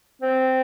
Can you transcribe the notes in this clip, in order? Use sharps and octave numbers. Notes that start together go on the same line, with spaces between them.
C4